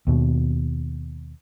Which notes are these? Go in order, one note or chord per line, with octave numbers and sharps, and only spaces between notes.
D#2 B2